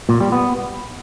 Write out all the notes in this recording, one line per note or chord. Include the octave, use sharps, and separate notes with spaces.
A#2
G3
B3